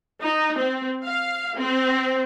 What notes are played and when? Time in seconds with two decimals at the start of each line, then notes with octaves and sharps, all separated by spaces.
0.22 D#4
0.56 C4
1.04 F5
1.58 C4